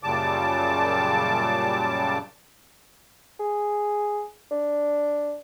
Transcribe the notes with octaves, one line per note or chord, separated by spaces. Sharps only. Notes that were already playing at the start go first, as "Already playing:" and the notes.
F#2 A#2 C#3 G3 A5 D6
G#4
D4